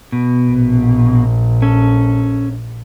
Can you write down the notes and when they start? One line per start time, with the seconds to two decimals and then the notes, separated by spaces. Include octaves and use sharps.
0.12 B2
0.49 A#1
1.62 C#4 A4